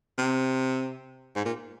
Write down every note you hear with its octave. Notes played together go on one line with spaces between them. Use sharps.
C3
G#2
A#2